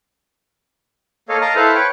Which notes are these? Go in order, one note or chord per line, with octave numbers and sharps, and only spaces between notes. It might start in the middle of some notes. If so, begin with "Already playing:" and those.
A#3 A4 C#5 D#5 F5
A#4 D#5 F5 A5 A#5
E4 A4 B4 C5 F5
B4 C#5 G5